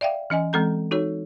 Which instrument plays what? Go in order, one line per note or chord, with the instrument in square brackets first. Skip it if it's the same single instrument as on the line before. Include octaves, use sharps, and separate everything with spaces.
[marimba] D5 E5 F5 G5
E3 C#4 D#5 G#5
E3 G#3 C4 A4 A#5 G6
D#4 F#4 A4 C#5